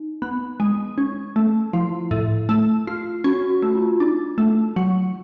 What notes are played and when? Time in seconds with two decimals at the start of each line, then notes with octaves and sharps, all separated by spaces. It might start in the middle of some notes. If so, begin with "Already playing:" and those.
Already playing: D#4
0.22 B3
0.60 G#3
0.98 C#4
1.36 A3
1.73 F3 E4
2.11 A2
2.49 A3
2.87 F4
3.24 C#4 F#4
3.50 F#4
3.62 A3
3.75 F4
4.00 D4 D#4
4.38 A3
4.76 F#3